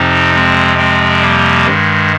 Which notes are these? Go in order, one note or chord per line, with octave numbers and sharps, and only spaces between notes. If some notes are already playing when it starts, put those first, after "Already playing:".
Already playing: F2 C3 F3 C4 D#4
G#3 C4
G#3 C4
G3 A#3
G2 D#3 G#3